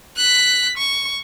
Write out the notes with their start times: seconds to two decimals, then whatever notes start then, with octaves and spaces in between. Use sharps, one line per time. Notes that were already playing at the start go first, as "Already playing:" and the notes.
0.17 F#6 B6
0.78 C#6